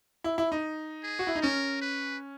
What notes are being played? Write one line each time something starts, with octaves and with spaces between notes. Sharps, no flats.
E4
E4
D#4
G#4
F#4
E4
D#4
C#4 A#4
B4